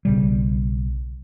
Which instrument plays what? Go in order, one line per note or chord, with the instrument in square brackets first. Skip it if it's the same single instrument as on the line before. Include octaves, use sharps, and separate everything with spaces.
[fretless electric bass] B1 C#3 G3